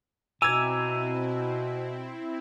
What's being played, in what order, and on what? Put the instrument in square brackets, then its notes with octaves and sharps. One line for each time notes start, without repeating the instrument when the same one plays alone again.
[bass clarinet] B2 [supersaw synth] C4 E4 [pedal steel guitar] G#5 A#5 D6 [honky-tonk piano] E6 G#6